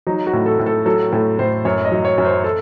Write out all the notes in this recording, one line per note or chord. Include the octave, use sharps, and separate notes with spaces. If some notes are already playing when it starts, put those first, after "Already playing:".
F#3 D#4
F#4
A2
A4
A2
A4
F#3 A4
A2 A4
A2 C5
F#2 C#5
D#5
F#3
C#5
F#2
C5
A4